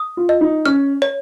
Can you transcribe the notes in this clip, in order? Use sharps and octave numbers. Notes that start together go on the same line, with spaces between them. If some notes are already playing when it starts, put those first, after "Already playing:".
Already playing: D#6
F4
D#5
D#4
C#4 F6
C#5